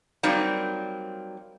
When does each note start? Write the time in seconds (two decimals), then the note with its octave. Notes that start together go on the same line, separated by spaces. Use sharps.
0.23 F#3 G3 A#3 C4 D#4 D5